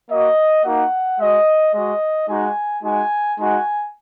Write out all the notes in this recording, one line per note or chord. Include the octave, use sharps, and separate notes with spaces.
A#3 F#4 D#5
A#3 D#4 F#4 F#5
G#3 F#4 D#5
G#3 F#4 D#5
G#3 D#4 F#4 G#5
G#3 D#4 F#4 G#5
G#3 D#4 F#4 G#5